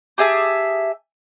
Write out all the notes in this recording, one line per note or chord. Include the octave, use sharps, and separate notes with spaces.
G4 G#4 E5 A5